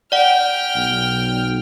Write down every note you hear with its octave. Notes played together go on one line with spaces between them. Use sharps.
D5 F#5 G5 F6
B1